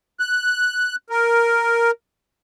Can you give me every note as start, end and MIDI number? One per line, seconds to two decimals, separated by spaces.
0.20 0.95 90
1.10 1.91 70